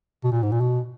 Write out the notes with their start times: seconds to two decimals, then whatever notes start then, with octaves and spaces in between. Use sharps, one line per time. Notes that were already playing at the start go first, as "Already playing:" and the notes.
0.24 B2
0.32 A#2
0.43 G#2
0.52 A#2
0.60 B2